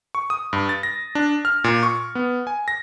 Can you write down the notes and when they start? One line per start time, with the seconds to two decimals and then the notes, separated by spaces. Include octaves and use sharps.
0.15 C#6
0.30 D#6
0.53 G2
0.69 A6
0.83 A#6
1.15 D4
1.45 F6
1.64 A#2
1.83 C#6
2.15 B3
2.47 G#5
2.68 A#6